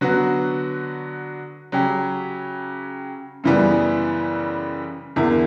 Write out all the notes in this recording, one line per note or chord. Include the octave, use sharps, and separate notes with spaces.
D3 F#3 B3 F#4
C#3 F#3 C#4 G4
F#2 C#3 E3 G3 B3
E2 D3 A#3 E4